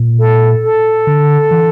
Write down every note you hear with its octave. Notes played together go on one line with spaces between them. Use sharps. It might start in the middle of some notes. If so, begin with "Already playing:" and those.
Already playing: A#2
A4
A4
D3
E3